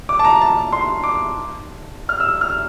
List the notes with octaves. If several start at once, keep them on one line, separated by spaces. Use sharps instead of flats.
D6
A5
A#5
A5
C6
D6
F6
E6
F6